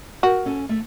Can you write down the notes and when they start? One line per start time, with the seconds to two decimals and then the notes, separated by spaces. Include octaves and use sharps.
0.23 F#4 A#4
0.46 C#4 A4 G#5
0.69 A3 E5